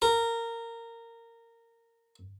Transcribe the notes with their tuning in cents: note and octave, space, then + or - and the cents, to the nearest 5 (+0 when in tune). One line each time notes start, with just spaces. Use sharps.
A#4 -15